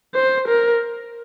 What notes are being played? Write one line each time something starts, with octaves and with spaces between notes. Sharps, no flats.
C5
A#4